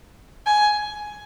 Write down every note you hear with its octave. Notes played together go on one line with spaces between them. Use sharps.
G#5